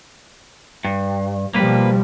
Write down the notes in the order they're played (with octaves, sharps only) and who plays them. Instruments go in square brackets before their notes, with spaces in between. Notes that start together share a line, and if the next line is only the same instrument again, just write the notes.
[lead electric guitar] G2
[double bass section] B2 F3 G3 [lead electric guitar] A#3 B4